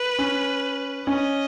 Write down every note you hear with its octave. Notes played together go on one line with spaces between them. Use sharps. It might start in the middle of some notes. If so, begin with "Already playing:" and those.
Already playing: B4
C#4
C#4 D#5